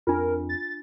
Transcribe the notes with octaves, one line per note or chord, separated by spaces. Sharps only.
F2 D4 F4 A#4
A6